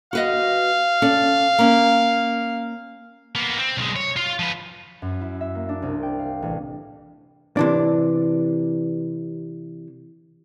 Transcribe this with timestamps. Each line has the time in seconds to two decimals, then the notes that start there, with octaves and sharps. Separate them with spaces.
0.13 F#4 B4 D#5 F5
1.02 C#4 A4 D5
1.58 A#3 C#4
3.35 A#3 B3
3.58 C4
3.77 B1 G#3
3.96 C#5
4.16 F4 F5
4.39 F3 B4
5.02 F#2
5.21 E4
5.41 E5
5.55 A#3
5.69 D4
5.82 C2
6.03 G5
6.19 F5
6.42 A1
7.57 C3 E3 D4